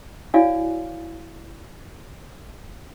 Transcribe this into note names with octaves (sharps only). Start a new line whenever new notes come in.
E4 F#4 C#5 D5 F5 G#5